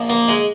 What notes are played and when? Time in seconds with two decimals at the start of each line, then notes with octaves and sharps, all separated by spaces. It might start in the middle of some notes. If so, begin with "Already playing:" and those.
Already playing: A#1 A#2 F3
0.09 A#3
0.28 G#3